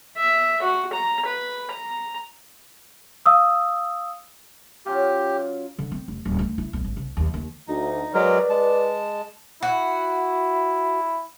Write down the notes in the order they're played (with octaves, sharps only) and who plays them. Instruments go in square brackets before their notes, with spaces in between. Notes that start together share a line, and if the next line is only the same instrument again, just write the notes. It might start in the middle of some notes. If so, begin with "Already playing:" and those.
[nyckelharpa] E5
F#4
A#5
B4
A#5
[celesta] F5 D#6 E6
[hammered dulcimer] F#3 C#4 F4 [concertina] G4
[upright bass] D3
C4
F1
D#1
D2
E4
B1
G#1
C2
D#2
D#2
[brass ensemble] D2 [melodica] D#4
[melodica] F#3 G#3 A#4 [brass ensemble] B4 D5
[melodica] G#3 A5
[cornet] E4 [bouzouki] F#4